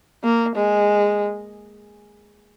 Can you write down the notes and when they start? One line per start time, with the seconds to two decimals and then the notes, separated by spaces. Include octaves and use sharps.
0.24 A#3
0.56 G#3